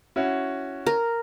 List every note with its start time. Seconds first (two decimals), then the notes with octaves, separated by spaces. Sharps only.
0.16 C#4 E4 F#4
0.86 A#4